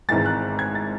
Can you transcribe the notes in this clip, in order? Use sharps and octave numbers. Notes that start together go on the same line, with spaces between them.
G#1 G#2 E3 G#3 A6
F#6
G#6
A6